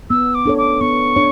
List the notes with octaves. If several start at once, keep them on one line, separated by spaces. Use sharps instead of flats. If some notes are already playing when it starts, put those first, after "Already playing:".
B3 E6
D6
D4 A4 C#5
D6
B3 C#6
D4 C#5